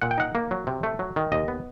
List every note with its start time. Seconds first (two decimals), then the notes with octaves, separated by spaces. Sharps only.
0.02 A#2 F#5
0.11 G5
0.18 D#4 F#5
0.35 A#3
0.51 F#3
0.67 C3
0.83 A3
0.99 F#3
1.16 D#3
1.32 D#2 D#5
1.48 B3